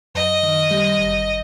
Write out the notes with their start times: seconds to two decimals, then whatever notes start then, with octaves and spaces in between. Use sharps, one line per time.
0.15 F#2 D#5
0.43 D#3
0.71 G3
0.99 G1